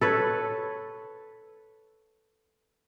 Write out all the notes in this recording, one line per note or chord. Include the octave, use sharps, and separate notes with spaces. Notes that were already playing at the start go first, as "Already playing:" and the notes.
A4 B4 C#5